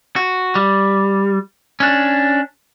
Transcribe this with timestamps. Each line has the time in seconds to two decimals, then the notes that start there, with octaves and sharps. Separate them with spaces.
0.16 F#4
0.55 G3
1.80 C#4 D4